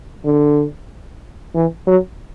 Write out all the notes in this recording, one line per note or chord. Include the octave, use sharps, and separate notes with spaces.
D3
E3
F#3